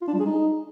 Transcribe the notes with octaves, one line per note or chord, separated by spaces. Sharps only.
F4
D4
G3
G#4
D#4